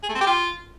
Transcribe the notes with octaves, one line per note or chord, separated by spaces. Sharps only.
G#4
A3
C4
G4
F4